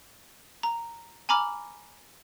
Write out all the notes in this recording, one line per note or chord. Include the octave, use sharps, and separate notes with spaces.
A#5
G#5 A#5 B5 D6 F6